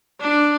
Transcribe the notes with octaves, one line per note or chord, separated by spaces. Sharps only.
D4